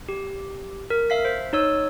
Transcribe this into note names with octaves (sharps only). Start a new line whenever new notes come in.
G4
A#4
E5 F5 B6
C5
D#4 C#5 E6